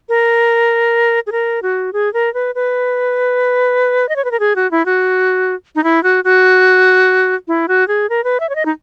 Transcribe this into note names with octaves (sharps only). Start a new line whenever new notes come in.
A#4
G#4
A#4
F#4
G#4
A#4
B4
B4
D#5
C#5
B4
A#4
G#4
F#4
E4
F#4
D#4
E4
F#4
F#4
E4
F#4
G#4
A#4
B4
E5
C#5
D#5
D#4